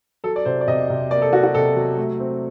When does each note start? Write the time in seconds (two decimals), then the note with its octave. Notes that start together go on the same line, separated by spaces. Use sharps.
0.24 F#3 A4
0.36 D5
0.45 C3 C5
0.61 D5
0.68 C3 D#5
0.90 C3
1.11 A#3 D5
1.22 A4
1.32 F#3 F#4
1.43 F#4
1.54 C3 A4
1.76 F#3
1.97 A3
2.20 C4